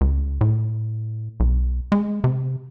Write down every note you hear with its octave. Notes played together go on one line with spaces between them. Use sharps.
C#2
A2
B1
G#3
C3